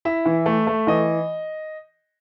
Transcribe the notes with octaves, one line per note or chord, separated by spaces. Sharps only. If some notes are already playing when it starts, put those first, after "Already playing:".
E4 E5
E3
A3
A3
E3 D#5